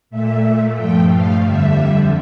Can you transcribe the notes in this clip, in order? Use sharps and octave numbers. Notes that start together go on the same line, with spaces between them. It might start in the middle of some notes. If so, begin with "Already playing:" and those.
A#2 A3 E5
G2 F3 A3 G5
F5
F2 D3 G3 E5